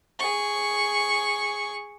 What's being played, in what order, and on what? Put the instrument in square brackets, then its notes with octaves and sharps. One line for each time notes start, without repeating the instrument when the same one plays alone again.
[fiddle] G#4 C#6